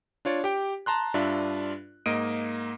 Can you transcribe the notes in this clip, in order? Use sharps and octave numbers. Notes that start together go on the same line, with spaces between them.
D4 F4 C#5 D5
G4 G5
A5 A#5 C6 F#6
G2 D4 F4 E5
G#2 A#3 D#5 D7 D#7